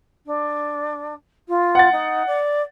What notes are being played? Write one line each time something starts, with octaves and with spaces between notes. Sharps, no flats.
D4
F4
F#5 A6
D#4
D5